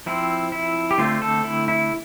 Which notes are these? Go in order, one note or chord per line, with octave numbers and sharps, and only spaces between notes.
F3 C4 E4
E4
G4
D3 A3 C4 F4
A4
E4
E4